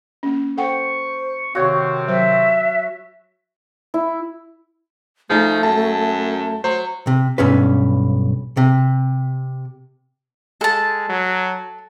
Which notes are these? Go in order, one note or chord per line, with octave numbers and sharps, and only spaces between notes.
A#3 C#4
A4 C5 F#5 G5 C#6
C3 D#3 C4 F#4 C#5 F5
F#3 C5 E5
E4
F3 A3 D#4 G#4
F#2 A5
F#3 C5
C3
B1 G2 C#4 B4
C3
G#3 A4 A5
F#3